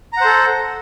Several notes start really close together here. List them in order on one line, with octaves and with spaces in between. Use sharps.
A#5 F#5 C5 A4